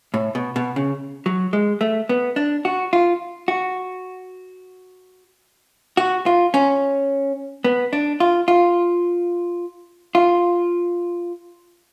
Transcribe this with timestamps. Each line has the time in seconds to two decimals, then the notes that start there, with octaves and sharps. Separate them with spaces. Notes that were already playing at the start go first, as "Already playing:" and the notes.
0.14 A2
0.35 B2
0.56 B2
0.76 C#3
1.26 F#3
1.53 G#3
1.81 A3
2.09 B3
2.36 D4
2.65 F#4
2.93 F4
3.48 F#4
5.97 F#4
6.26 F4
6.54 C#4
7.64 B3
7.93 D4
8.20 F4
8.48 F4
10.15 F4